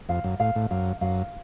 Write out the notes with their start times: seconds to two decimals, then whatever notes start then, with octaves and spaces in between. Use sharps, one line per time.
0.09 F2 F5
0.24 F#2
0.40 A2 F5
0.56 A2
0.71 F#2 F5
1.01 F#2 F5